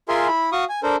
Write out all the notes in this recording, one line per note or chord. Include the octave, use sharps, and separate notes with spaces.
F4 G#4 A#4 E5 G#5 C6
E4 B5
F#4 F5 C#6 D#6
G#5
D4 A4 A#4 C5